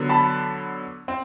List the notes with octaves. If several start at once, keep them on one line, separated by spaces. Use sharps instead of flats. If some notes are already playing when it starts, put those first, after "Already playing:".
Already playing: D3 F#3 B3
A5 B5
C4